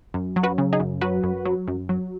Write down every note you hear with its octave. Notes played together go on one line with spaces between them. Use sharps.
F#2
F#3
F#4 B4
C#3
D#4 G#4
F#2
F#3 F#4 B4
F#2
F#3
F#2
F#3